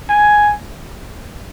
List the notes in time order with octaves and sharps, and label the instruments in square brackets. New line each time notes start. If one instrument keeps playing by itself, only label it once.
[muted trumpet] G#5